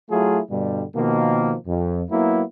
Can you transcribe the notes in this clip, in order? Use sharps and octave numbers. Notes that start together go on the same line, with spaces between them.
F#3 A3 E4 F4 G#4
G2 B2 D3 G3
B2 D#3 F3 A#3
F2
F#3 A#3 B3 E4